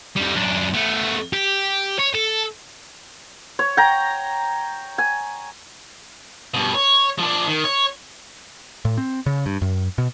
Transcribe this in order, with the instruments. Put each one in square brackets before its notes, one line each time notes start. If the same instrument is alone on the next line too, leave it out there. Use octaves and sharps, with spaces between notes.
[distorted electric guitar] F2 G3
F#2 D4
A3 B3
G4
C#5
A4
[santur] C#5
G5 A#5
G#5
[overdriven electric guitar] G2 B2
C#5
F3 D4
D#3
C#5
[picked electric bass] A2
C4
C#3
G2
F#2
B2